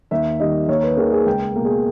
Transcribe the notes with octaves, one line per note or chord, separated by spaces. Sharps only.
D#2 E5
D#3 G3 D#5
D#2 C#5
B4
D#3 A#3 G#4
G#4
C#2 G5
B2 A#3
G#4